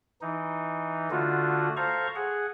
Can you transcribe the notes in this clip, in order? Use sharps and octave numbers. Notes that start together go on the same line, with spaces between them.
E3 D#4
D3 A3 F4 F#4
A4 C5 F5 A#5 C#6
G#4 F#5